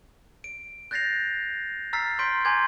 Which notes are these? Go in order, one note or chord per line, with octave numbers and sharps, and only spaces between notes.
D7
F#6 G6 A6 A#6 C7 F7
A#5 E6 F6 A6 B6 C7
C6 C#6 G6 B6 D7
G#5 A#5 C6 D6 G6 G#6